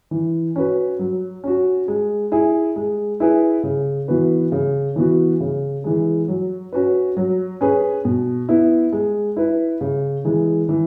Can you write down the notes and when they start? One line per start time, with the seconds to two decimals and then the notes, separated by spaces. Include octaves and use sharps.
0.11 E3
0.56 C#4 F#4 B4
0.99 F#3
1.44 C#4 F#4
1.88 G#3
2.32 E4 G#4
2.76 G#3
3.20 E4 G#4 B4
3.63 C#3
4.08 E3 B3 F#4 B4
4.52 C#3
4.96 E3 B3 F#4
5.40 C#3
5.84 E3 G#3
6.28 F#3
6.73 C#4 F#4 B4
7.17 F#3
7.61 C#4 G#4 B4
8.05 B2
8.49 B3 E4
8.93 G#3
9.37 E4 B4
9.81 C#3
10.25 E3 G#3
10.69 E3